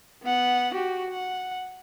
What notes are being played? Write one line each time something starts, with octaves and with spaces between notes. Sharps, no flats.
B3 F#5
F#4 G4
F#5